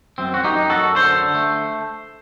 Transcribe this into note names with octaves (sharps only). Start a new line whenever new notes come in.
F#2 C4
F#2 F#4
D#4 G4
F#2
F#4 A4
F#2
D3 A4 C5
D3
A3